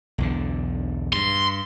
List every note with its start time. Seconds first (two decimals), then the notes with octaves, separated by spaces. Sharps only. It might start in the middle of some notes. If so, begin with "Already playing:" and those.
0.18 B1 E2 D3
1.13 G2 C6